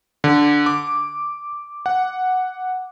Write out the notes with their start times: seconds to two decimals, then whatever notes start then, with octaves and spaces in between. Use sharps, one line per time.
0.24 D3
0.66 D6
1.86 F#5